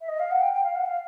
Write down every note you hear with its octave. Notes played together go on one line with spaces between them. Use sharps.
E5
D#5
F5
F#5
G5
G5
F5
F#5
F5